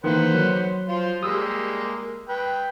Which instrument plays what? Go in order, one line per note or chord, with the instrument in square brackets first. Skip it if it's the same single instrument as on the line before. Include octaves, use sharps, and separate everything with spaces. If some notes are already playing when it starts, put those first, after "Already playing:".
[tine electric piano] D#3 E3 A#3 [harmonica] B4 C5 F#5
[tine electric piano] F#3
[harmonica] F4 C5
[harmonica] G3 G#3 A#3 [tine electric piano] D#6 E6
[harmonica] B4 G5